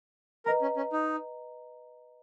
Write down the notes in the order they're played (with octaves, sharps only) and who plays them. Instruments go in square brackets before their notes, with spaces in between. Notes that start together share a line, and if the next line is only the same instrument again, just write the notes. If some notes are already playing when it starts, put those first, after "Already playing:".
[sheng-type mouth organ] A#4 [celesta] B4 D#5 A#5
[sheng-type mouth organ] C#4
C#4
D#4